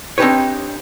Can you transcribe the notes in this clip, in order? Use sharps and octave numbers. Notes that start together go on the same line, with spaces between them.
C4 D4 D#4 G4 B4 C#5